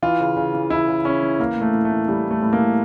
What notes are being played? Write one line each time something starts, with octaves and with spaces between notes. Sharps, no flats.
E3 F4
C#3
C#3
E3
E3 E4
C#3
C#3 C#4
E3
E3 A#3
A2
A3
A2
A3
E3
E3 G3
A2
A3
A2
A#3
E3